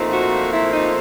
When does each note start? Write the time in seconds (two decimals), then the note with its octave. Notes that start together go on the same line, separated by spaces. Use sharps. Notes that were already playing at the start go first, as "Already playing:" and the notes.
Already playing: A#2 F3 A3 C4 D#4
0.13 F#4
0.53 E4
0.74 D#4